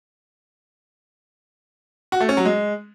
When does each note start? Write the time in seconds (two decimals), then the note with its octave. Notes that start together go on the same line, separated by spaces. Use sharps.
2.12 F#4
2.20 A3
2.29 C#4
2.37 F#3
2.45 G#3